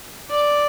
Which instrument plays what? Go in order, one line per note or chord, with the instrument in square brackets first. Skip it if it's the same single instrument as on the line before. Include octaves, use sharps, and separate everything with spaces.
[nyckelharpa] D5